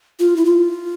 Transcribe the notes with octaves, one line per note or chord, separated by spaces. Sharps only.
F4
E4
F4